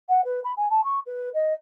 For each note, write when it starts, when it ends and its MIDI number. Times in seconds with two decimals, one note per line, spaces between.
0.09 0.21 78
0.25 0.40 71
0.44 0.52 83
0.57 0.69 80
0.70 0.81 81
0.84 0.99 85
1.06 1.29 71
1.34 1.53 75